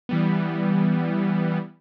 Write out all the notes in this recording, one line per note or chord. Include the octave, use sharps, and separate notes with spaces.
E3 G3 B3